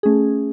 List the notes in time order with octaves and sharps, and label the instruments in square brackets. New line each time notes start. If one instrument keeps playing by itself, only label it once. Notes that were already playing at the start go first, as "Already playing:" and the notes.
[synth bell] A3 C#4 G#4